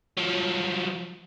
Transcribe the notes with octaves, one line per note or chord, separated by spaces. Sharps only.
F3 F#3